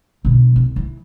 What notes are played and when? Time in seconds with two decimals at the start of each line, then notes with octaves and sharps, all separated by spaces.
0.25 B2 D3
0.56 C2
0.76 E3